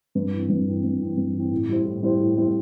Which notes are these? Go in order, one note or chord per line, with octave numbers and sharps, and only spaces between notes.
G2
E3 C4
G2
E3 C4
G2
E3 C4
G2
E3 C4
A2
G3 E4 C5
A2
G3 E4 C5
A2
G3 E4 C5